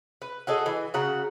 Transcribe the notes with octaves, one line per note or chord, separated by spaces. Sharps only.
B4
F#4 G#4 A4 D#5
E3
C#3 F#4 F#5 A#5